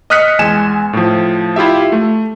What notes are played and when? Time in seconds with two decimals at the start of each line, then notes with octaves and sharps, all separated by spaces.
0.10 D#5 D#6 F6 F#6 B6 C#7
0.39 E2 G#3 G#5 E7
0.93 A2 F3
1.56 E4 F4 G4 E5
1.92 A3